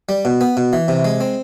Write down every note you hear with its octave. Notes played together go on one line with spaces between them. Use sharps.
G3
B2
B3
B2
E3
C3
G#3
C4